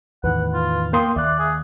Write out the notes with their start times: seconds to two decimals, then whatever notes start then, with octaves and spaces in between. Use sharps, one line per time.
0.24 E2 A2 D#3 B4 F#5
0.53 F4
0.93 A#3 G5 C6 D#6
1.16 D#2 D5 E5 F#6
1.39 G#4